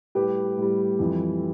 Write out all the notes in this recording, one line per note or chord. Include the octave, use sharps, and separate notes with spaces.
A2 G3 G4 B4
A2 G3
F2 E3 G3